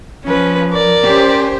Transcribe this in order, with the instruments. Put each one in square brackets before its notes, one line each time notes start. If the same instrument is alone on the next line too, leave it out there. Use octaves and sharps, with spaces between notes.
[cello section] F3 [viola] C#4 B4
[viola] A#4 D5
[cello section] C#4 G4 C5